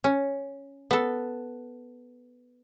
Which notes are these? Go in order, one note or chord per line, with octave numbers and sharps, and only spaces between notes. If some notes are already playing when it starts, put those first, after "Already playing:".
C#4
B3 A4